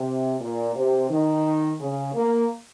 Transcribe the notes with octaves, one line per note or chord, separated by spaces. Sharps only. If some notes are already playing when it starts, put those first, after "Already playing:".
Already playing: C3
A#2
C3
D#3
C#3
A#3